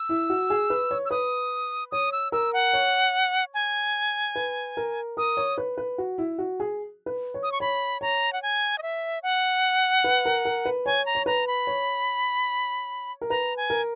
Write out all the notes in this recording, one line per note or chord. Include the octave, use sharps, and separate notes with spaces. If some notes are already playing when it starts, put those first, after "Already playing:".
Already playing: E6
E4
F#4
G#4
B4
C#5
E6
B4 D#6
C#5 D#6
E6
A#4 E6
F#5
C#5
G#5
B4
A#4
A#4 D#6
C#5
B4
B4
F#4
E4
F#4
G#4
B4
C#5
D#6
C#6
C#5 B5
C#5 A#5
F#5
G#5
D#5
E5
F#5
B4
A#4
A#4
B4
C#5 G#5
A#5
C#5
B4 A#5
B5
C#5
A#4
B4 A#5
G#5
A#4